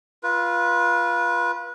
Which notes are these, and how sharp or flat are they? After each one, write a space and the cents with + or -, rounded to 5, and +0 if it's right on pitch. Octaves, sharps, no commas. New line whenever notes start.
F4 +0 B4 -25